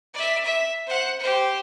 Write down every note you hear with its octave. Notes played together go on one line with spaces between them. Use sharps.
D5 E5
E5
C5 F#5
G4 C5